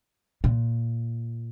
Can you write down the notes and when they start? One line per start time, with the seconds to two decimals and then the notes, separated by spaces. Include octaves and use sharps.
0.44 A#2